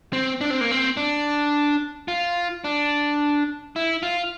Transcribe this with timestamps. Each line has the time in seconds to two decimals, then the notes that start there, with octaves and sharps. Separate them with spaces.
0.13 C4
0.41 D4
0.50 C4
0.61 A#3
0.71 C4
0.97 D4
2.08 F4
2.64 D4
3.76 E4
4.03 F4